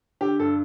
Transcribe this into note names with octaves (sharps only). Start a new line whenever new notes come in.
D3 G4
G2 A4